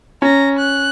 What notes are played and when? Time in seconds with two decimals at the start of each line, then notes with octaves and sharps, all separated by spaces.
0.22 C#4 A#5
0.59 F#6